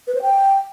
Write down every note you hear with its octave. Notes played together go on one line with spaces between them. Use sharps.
B4
C5
G5